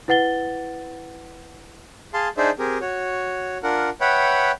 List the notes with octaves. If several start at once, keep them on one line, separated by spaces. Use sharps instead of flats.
E4 B4 F#5 A6 G7
G#4 F5 A5 C6
D4 D#4 G#4 C5 D5 E5
C4 G4 G#4 A#4
F#4 C#5
D4 F4 A#4 F#5
B4 C#5 E5 F#5 G5 B5